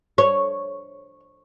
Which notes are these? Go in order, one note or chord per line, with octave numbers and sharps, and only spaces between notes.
C#5